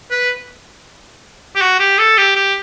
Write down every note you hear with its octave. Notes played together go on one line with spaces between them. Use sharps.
B4
G4
F#4
G4
A4
G4
G4